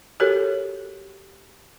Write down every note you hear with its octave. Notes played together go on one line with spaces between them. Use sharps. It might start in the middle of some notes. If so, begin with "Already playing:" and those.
F#4 G4 A4 A#4 C#5